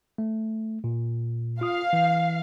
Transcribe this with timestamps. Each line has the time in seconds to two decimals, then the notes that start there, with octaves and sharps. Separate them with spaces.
0.18 A3
0.84 A#2
1.61 F4 F5 D#6
1.93 E3